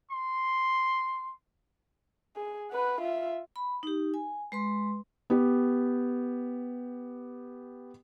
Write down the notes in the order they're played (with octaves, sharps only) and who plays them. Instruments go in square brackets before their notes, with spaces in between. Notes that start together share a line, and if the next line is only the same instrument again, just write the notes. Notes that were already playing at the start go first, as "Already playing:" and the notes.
[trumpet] C6
[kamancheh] G#4
B4 F#5
F4 E5
[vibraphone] B5
D#4 G4
G#5
G#3 B4 C6
[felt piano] B3 G4